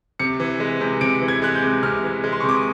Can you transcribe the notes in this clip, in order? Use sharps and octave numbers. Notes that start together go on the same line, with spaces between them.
C3 C#7
E3
G#3
C3
C3 D7
E3
G#6
G#3 F#6
G6
C3
C3 F6
E3
G#3
C6
C#6
C3 D6
D#6